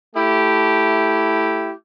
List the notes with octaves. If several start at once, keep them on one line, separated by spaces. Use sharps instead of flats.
A3 E4 G4